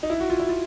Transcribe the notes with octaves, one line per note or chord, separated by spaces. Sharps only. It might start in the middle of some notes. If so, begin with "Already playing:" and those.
D#4
E4
F#4
F4
E4
F4